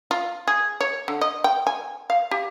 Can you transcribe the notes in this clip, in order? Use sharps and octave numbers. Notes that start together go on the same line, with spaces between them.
F4
G#4
C#5
D3
D#5
G5
G#5
F5
G4